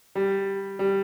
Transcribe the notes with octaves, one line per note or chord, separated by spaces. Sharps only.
G3
G3